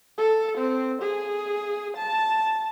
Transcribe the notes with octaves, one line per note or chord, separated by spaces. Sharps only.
A4
C4
G#4
A5